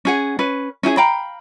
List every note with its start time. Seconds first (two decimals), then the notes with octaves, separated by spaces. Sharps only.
0.05 C#4 G#4 F#5
0.39 C#4 B4
0.83 C#4 E4 G4 G#4
0.97 F5 G5 A#5 B5